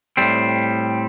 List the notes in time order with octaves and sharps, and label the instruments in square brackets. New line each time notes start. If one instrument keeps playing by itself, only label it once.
[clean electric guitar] A2 G3 C4